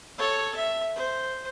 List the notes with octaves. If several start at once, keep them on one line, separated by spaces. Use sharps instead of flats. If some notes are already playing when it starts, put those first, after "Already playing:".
A4 C#5
E5
C5